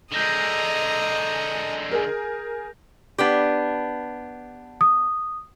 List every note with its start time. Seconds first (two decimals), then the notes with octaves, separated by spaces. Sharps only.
0.12 D3 G#3 D#5 A#5 G6 A#6 F7
1.91 G#4 A#4
3.18 B3 D4 G4
4.81 D#6